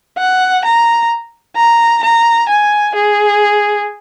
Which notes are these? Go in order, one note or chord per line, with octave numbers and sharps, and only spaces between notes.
F#5
A#5
A#5
A#5
G#5
G#4